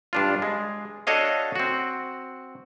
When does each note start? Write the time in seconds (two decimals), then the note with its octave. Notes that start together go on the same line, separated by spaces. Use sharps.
0.13 G2 D4 F4
0.42 G#3
1.07 D4 F#4 A4 C#5 D#5 F5
1.55 C4 F#4